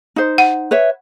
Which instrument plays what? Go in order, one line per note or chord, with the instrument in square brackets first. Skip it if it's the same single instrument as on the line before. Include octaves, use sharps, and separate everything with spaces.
[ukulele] D#4 C5
[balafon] F#5
[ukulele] B4 C#5 E5